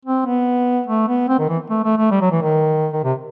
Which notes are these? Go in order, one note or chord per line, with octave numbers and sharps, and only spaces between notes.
C4
B3
A3
B3
C4
D#3
E3
A3
A3
A3
G3
F#3
E3
D#3
D#3
C3